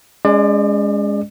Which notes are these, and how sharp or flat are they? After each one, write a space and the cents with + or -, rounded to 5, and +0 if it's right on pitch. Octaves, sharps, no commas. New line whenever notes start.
G#3 -10 C#4 +25 D5 +35